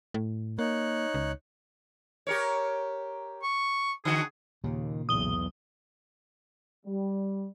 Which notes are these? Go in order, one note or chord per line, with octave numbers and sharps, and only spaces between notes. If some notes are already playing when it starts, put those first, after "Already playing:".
A2
A#3 D#4 C#5 F#6
C#2
G4 A#4 C#5
C#6
D3 F#4 G#4
D#2 A#2 C#3
B1 E2 D#6 G7
G3